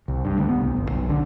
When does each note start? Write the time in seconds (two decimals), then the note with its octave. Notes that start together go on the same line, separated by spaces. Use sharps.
0.08 C2
0.25 G2
0.38 D2
0.49 B3
0.61 C2
0.76 G1
0.91 B1
1.09 D3